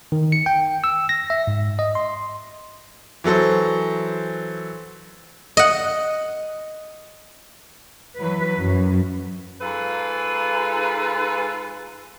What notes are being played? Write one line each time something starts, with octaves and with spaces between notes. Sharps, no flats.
D#3
C#7
G5
E6
A#6
E5
G#2
D#5
C6
E3 F#3 A4 C5
D#5 F#5
E3 F#3 B4
F#2
G#2 F4 A4 B4